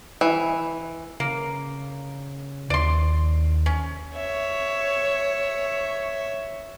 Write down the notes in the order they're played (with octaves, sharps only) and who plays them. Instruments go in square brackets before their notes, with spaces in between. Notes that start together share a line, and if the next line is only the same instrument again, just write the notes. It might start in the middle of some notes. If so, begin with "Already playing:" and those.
[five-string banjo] E3
[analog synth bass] C#3 [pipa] A#3
[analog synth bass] D#2 [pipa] D5 C6
[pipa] C#4
[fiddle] C#5 E5